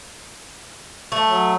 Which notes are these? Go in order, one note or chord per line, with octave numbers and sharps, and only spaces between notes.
A3
F#3